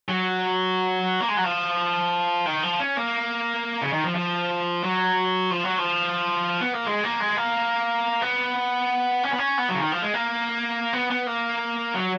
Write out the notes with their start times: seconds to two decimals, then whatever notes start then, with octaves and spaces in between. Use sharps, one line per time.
0.09 F#3
1.20 A#3
1.28 G#3
1.37 F#3
1.44 F3
2.46 D#3
2.63 F3
2.80 C#4
2.97 A#3
3.82 C#3
3.93 D#3
4.04 F3
4.15 F3
4.84 F#3
5.51 F3
5.64 F#3
5.78 F3
6.61 B3
6.73 A#3
6.87 G#3
7.04 A#3
7.20 G#3
7.37 A#3
8.22 B3
9.23 C#4
9.31 B3
9.38 C#4
9.58 B3
9.69 F#3
9.74 C#3
9.80 D#3
9.92 F3
10.02 G#3
10.14 A#3
10.93 B3
11.10 B3
11.27 A#3
11.94 F#3